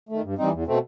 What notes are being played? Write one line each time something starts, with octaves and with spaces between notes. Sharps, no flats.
D#3 A3
G2
E3 G3 C4 D#4
E2
B2 A3 C4